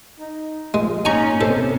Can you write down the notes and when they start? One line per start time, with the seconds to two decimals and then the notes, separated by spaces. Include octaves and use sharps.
0.20 D#4
0.74 F3 G#3
1.05 A#3 C#4 D#4 G#5 A#5 C#6
1.41 C3 B3 A4 C5